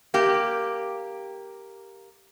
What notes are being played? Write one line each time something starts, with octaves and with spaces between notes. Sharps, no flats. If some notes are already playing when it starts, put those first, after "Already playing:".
A#3 G4